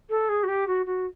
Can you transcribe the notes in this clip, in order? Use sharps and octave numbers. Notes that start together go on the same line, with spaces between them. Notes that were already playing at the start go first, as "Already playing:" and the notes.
A4
G#4
F#4
G4
F#4
F#4